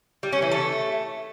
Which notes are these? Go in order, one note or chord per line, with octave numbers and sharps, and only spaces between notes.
G3
C#4
E3
A3